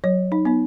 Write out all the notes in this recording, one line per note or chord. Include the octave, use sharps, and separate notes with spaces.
F#3 C#5
D#4
B3 D#4